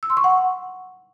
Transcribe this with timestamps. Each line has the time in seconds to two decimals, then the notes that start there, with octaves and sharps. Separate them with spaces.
0.03 E6
0.10 C6
0.17 C#6
0.24 F#5